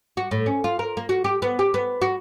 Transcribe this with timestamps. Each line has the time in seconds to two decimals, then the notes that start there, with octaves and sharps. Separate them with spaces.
0.17 F#4
0.31 A2
0.46 C#4
0.64 F4
0.79 A#4
0.97 A#3
1.09 F#4
1.24 G4
1.42 B3
1.59 G4
1.74 B3
2.02 F#4